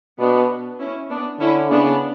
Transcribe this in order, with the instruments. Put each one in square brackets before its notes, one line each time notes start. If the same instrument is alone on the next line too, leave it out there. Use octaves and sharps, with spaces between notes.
[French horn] B2 [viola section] B3 D4
[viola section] C#4 E4
B3 D4
[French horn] D3 [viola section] C#4 E4
[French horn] C#3 [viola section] B3 D4